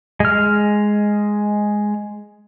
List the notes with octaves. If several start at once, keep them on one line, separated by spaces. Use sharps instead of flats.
G#3 F6